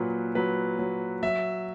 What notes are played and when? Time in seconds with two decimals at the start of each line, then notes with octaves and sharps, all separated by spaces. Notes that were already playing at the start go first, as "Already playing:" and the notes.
Already playing: A#2 F#3 B4
0.35 F#3 B4
0.79 F#3
1.23 F#3 E5